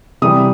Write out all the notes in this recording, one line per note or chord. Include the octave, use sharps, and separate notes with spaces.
C3 E3 G3 D#6